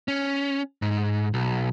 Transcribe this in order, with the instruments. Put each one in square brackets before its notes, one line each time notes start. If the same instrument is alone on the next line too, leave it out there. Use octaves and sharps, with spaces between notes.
[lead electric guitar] C#4
G#2
B1